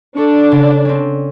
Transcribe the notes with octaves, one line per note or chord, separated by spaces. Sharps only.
D4 A4 C#6
C#3
C4 C#4